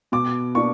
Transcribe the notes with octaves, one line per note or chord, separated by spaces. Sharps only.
B2 D6
A#3 D4 C#6